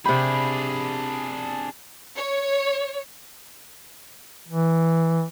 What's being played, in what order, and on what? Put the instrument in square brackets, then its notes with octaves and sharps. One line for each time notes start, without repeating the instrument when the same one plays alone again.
[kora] C3 G4 [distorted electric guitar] D4 G#4 [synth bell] B5
[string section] C#5
[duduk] E3